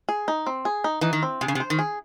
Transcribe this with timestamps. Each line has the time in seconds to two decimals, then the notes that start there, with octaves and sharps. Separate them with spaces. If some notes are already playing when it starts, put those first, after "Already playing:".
0.09 G#4
0.28 D#4
0.47 C4
0.65 G#4
0.84 D#4
1.01 E3 D#4
1.13 D#3
1.23 C4
1.41 C3 G#4
1.48 C#3
1.55 C3
1.60 C5
1.70 D#3
1.79 G#4